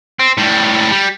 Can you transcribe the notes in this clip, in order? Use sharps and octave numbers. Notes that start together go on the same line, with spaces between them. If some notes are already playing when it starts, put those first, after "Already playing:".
C4
A2 G3
G3